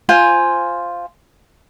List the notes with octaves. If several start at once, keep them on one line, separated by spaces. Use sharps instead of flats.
F4 C5 G#5